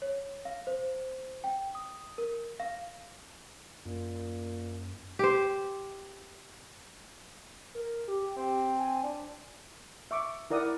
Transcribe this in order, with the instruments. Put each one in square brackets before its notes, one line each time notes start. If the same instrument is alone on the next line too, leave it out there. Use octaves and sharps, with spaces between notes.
[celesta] C#5
F5
C5
G5
D#6
A#4
F5
[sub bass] F#2 [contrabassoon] A#2
[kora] G4 C5
[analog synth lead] A#4
G4
[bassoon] C4
[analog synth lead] G#5
[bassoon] D4
[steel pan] E5 C#6 D6
E4 A#4 D5 F#5 D#6